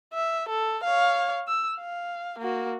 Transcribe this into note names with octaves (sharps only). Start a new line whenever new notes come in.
E5
A4
C#5 F5
E6
F5
A#3 F#4